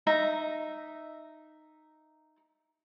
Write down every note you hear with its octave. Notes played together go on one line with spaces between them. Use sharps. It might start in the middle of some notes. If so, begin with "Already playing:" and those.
D#4 E5 A#5